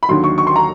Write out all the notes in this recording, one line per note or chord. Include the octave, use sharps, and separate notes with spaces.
B5
D#2 D3 F#3 C6
C#6
C#6
C6
A#5